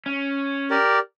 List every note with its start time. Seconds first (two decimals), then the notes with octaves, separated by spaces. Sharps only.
0.06 C#4
0.70 G4 A#4 D5